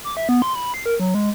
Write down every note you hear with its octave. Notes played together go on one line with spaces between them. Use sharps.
D6
E5
B3
C6
B5
C7
A#4
F#3
G#3